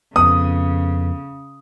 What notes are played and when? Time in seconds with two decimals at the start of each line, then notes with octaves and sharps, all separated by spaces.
0.16 F2 C#3 B3 D#6